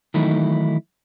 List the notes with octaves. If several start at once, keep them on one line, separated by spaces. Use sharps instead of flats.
D#3 E3 F#3 A3 D#4 E4